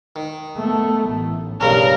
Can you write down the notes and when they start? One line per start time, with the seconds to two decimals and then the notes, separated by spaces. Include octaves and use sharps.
0.16 D#3
0.57 A3 B3
1.10 A1
1.61 B1 G2 C#3 C#4 A#4